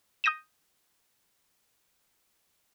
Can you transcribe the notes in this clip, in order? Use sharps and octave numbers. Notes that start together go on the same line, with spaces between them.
D#6 G6 A#6 D#7 E7